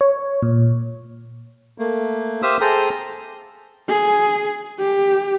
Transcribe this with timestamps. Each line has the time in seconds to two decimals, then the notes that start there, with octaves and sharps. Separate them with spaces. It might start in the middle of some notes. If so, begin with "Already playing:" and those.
0.01 C#5
0.43 A#2
1.78 A3 A#3
2.42 G4 C5 E5 F5 D#6 E6
2.61 G#4 A4 C5 G5 A#5 D#6
3.89 G#4
4.79 G4